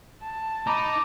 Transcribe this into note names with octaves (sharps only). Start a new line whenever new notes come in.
A5
D#4 A#5 B5 D6